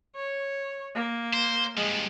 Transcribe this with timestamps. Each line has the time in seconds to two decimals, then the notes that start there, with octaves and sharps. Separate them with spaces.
0.16 C#5
0.95 A#3
1.33 C5
1.78 G2 F3 G#3